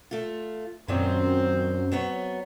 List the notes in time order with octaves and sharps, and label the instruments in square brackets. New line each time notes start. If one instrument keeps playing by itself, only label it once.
[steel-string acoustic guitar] A3 F4
[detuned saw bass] F#2 [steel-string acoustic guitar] A#2 D#3 F#3 [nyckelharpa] C4 C5
[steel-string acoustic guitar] F#3 B3 C#5